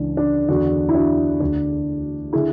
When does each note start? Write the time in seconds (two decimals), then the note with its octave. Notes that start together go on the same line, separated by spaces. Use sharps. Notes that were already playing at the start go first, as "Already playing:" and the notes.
Already playing: C#2 C#3 E3 D4
0.17 D4
0.48 E2 D3 D4 F#4
0.89 E4
0.95 D4 F#4
1.40 D2 D3 D4
2.33 D3 E4 G#4